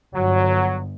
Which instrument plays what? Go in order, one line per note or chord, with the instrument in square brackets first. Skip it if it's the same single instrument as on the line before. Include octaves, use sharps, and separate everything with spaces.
[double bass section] G1 [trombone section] F#3